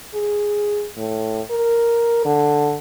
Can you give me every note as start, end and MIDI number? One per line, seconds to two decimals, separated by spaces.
0.14 0.86 68
0.97 1.41 45
1.50 2.21 70
2.25 2.77 50